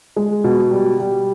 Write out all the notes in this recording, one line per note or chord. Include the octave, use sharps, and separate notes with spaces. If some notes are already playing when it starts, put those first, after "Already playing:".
G#3
B2
G3
G3